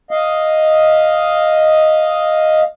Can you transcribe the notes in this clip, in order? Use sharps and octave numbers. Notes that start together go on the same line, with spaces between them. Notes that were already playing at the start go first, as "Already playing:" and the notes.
D#5 F5